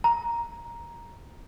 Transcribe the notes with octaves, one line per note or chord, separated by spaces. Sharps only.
A#5